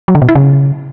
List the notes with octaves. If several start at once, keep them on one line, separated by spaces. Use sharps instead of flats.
F#3
D3
B2
E4
C#3